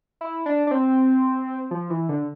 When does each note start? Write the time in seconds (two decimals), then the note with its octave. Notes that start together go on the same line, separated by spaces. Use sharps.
0.21 E4
0.46 D4
0.67 D4
0.71 C4
1.71 F3
1.90 E3
2.09 D3